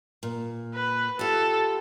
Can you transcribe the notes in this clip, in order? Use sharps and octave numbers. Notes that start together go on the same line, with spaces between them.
A#2
B4
F4 G4 A4